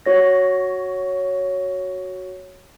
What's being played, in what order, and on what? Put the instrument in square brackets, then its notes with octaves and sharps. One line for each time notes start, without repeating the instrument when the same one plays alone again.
[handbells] F#4 C#5 A#6